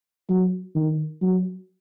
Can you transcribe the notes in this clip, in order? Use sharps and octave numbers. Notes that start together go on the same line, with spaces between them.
F#3
D#3
F#3